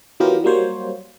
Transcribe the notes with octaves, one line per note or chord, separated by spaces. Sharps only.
E3 F#3 B3 F4 G4 A#4
F#3 G3 A#3 C5 C#5